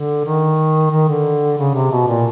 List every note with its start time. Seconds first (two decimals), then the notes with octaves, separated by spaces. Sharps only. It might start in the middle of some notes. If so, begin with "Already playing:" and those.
Already playing: D3
0.25 D#3
0.91 D#3
1.08 D3
1.58 C#3
1.75 C3
1.91 B2
2.08 A#2